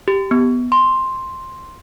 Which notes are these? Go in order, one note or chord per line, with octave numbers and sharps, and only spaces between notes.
G4
B3
C6